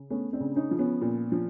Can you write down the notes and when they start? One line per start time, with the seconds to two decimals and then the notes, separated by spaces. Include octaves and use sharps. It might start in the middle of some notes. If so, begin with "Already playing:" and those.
Already playing: C#3
0.10 A3 B3 C#4
0.33 C4 D4
0.40 C#3
0.55 C#4 D#4
0.71 F3
0.79 B3 C#4
1.02 A#2
1.32 F3